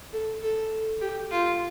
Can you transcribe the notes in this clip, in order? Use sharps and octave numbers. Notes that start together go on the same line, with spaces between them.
A4
A4
G4
F4